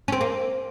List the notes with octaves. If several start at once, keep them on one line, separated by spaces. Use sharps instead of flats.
C#4
C4
A#3